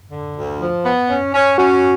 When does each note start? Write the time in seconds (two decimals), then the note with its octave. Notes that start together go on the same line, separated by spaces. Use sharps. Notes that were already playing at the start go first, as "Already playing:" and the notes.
0.11 D3
0.36 D2
0.60 F3
0.84 B3
1.09 C#4
1.33 C#4
1.58 C#4 F#4